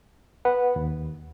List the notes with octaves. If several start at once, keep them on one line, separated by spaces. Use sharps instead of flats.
B4 F#5
D#2